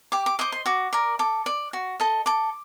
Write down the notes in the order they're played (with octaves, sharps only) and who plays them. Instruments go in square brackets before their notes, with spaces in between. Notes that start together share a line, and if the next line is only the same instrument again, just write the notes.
[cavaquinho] G4 D6
D6
C5 D#5 D6
C6
F#4 D6
A#4 D5
A4 D6
D5
F#4
A4 D#5
A4 D6